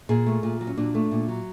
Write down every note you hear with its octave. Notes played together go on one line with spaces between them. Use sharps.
A#2 G#4
A3
A#2
F#3
C#4
A#2 D4
A3
A#2
F#3